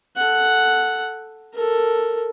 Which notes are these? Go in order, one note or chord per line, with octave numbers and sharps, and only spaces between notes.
A4 F#5
A4 A#4